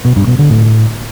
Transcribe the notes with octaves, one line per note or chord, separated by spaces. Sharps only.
B2
G2
B2
D3
A2